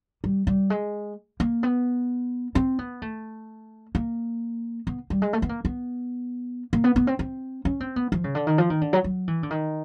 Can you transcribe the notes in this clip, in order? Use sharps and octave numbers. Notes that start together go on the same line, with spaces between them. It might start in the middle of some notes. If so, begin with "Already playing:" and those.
G3
G3
G#3
A#3
B3
C4
B3
A3
A#3
B3
G3
G#3
A3
B3
A#3
B3
A#3
B3
B3
C4
C4
C#4
C4
B3
F3
C#3
D3
D#3
F3
D#3
D3
F#3
F#3
E3
D3
D#3